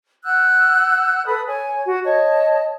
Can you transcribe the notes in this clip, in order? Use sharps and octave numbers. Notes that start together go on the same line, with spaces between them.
F#5 E6 F#6 G6
A4 B4 B5 D#6
C#5 G#5
F#4
C#5 D#5 A5